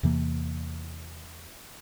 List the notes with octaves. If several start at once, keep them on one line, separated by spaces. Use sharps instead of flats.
E2 C3 E3 A#3